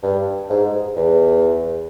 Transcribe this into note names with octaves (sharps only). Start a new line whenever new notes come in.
G2
G#2
E2